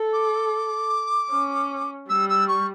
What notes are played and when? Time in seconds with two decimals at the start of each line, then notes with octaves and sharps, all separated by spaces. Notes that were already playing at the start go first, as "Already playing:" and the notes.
Already playing: A4
0.13 D6
1.30 C#4
2.09 G3 E6
2.29 E6
2.48 C#6